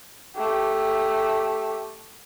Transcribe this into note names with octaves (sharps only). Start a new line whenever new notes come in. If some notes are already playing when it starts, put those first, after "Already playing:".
A3 G4